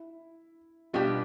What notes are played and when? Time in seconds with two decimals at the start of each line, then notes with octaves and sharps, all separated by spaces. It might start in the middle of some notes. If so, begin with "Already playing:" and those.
Already playing: E4
0.93 B2 G3 D4 F4 G4 B4